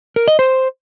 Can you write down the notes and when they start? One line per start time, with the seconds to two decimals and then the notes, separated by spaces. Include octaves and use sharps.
0.16 A#4
0.28 D#5
0.39 C5